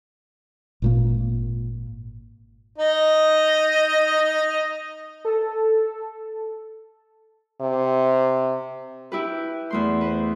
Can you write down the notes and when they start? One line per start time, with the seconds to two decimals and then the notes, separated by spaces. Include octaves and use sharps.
0.82 G#1 A#2 A#3
2.78 D#4 D#5
5.25 A4
7.61 C3
9.12 E4 G4 B4
9.70 E2 A3 C6
10.01 B4 C5